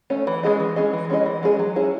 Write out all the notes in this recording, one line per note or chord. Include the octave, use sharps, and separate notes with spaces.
A3 C#4
E3
G#3 C#4 G#4 D#5
E3
G#3 C#4 G#4 D#5
E3
G#3 C#4 G#4 D#5
E3
G#3 C#4 G#4 D#5
F#3
C#4 E4 G#4